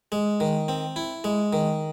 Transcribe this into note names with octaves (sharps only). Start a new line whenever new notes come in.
G#3
D#3
C4
E4
G#3
D#3